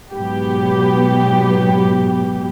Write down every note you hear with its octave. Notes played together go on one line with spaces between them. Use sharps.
G#2 B2 F#3 B3 G4